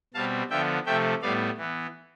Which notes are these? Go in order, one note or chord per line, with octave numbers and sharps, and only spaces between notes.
B2 G3 C4 F5 A5
D3 F3 B3 E5 G5
C3 F3 A3 E5 G5
A2 G3 B3 D5 F5
E3 B3